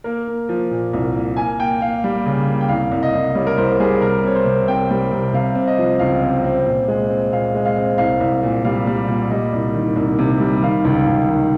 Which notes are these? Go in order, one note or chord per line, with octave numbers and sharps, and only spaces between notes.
A#3 A#4
A#3
F3
A#2
C2
A#3
A#3 G#5
A#3 G5
A#3 F5
G3
C#3
A#3
G5
C2 F5
C2
D#5
C2
G3 C#5
A#4
C2 C5
G3 G#4
C3 A#4
C4 C#5
C5
C3
C4 G5
G3
C3
C3 F5
C4
D#5
F3
C#2 F5
C4
C4
A#2
G#3
C4
A#2 F5
G#3
F5
C4
C2 F5
C2
A#2
G3 F5
G3
A#2
G3 D#5
C2
D#3
C2
C3
G3
D#3 F5
C#2
C#2
D#3